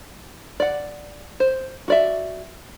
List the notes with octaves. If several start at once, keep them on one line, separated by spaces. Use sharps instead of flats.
D5 F#5
C5
F#4 D5 E5